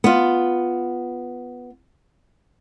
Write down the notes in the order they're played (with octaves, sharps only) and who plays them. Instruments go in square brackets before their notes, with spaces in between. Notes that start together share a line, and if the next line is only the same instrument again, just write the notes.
[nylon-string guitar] B3 F4